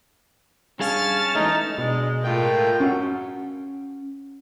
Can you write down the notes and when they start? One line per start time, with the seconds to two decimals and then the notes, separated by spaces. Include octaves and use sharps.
0.80 G2 C#4 G#4 F5 A5 F6 A6
1.35 E3 G#3 A3 D#4
1.78 B2 F#3 G#3 D4 D5
2.23 A2 G#3 F4 A#4 G5
2.80 C#4 F#4 F#5